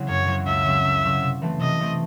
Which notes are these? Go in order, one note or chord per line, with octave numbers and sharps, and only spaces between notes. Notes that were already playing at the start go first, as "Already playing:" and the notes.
Already playing: C#3 F#3 C4 E4
F#2 C#5
C#3 F#3 C4 E4
C#2 E5
C#3 F#3 C4
C#2
C#3 F#3 C4
C3
E3 A3 C4
C3 D#5
E3 A3 C4